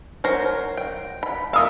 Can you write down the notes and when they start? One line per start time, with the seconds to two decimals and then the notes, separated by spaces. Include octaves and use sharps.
0.24 F#3 A#4 C5
0.77 G5
1.23 B5
1.53 A3 A#4 F5 D#6 E6